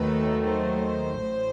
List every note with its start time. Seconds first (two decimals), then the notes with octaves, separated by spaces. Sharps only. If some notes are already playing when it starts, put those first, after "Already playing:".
Already playing: D#2 D#3 F#3 A3 B4
0.47 C5
1.20 A1 A2